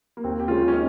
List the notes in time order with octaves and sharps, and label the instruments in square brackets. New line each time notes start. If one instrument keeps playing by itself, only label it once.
[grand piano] A#3
[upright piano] D#2 [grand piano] C4
[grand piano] G4
[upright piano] C#3 G#3 C#4 [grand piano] F4
[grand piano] C#4
D#4